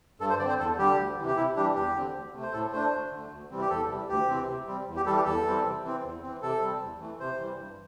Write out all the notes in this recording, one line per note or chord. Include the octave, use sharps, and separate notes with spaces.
G2 A4
C5
D3 C4 D5
C5
E2 A4
D3 G3 G4
D2
C3 E3
G4
C3 E4
E3 G3 D4 G4
E2 G4
D3 C4
D2
C3 A3
C5
A2 A4
A3 D4 C5
D2
D3 A3
D2
C3 E3 G3 C4
G4
E2 A4
C3 E3 G3
D2 G4
C3 E3 C4
C3
G3 C4
E2
G4
E3 G3 A4
G4
E2 A4
E3 G3 C4
C3
E3 C4
E2
E3 C4
C3 A4
G3 C4
E2
E3 A3
C3 C5
E3 G3
G2